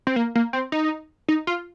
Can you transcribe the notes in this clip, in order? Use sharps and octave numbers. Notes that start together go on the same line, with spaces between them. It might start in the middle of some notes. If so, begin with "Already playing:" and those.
C4
A#3
A#3
C4
D#4
D#4
F4